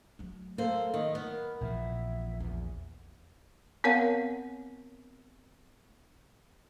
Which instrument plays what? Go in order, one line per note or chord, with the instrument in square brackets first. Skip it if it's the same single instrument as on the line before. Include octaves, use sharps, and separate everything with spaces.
[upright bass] F#3 A3
[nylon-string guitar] A#3 C5 [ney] A4
[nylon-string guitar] D#3 [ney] D#5
[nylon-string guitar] B3 [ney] A#4
[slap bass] A#1 A#2 E3 [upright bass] C4 [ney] E5
[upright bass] E2
[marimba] B3 C4 A#4 C#5 F5 F#5